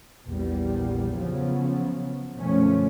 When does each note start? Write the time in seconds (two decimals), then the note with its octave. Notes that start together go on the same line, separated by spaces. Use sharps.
0.25 A#1 E2 G3
1.13 C#3 F3 F#3 B3 C#4
2.34 F#2 B2 D3 F3 A3 C#4